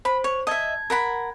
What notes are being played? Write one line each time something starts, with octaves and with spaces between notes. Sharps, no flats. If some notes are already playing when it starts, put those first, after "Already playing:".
C5 B5
C#5
D#5 E5 A5 G#6
A#4 F#5 B5